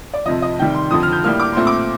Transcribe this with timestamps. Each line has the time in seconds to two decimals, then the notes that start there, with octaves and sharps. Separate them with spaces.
0.14 D5
0.26 F2 C3 F3 D#5
0.42 D#5
0.59 C3 D#3 G3 G5
0.74 C6
0.91 F2 D3 F3 D#6
1.03 F6
1.12 G6
1.24 A2 G3 A#3 F6
1.40 D6
1.53 A#2 A3 C4 C6
1.67 D6